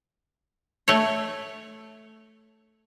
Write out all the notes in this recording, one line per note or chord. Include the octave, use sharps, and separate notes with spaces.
A3 C#5